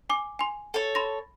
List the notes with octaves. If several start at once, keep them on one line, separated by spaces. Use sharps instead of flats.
G#5 D6
G#5 C6
A4 C#5
B5 C6 A#6